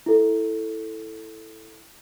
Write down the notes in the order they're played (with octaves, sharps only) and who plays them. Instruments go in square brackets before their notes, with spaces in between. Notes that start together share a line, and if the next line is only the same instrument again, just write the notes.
[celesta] E4 A4